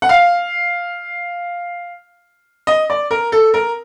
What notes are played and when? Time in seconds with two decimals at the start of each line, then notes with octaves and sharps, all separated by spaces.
0.02 F#5
0.09 F5
2.67 D#5
2.90 D5
3.11 A#4
3.32 A4
3.54 A#4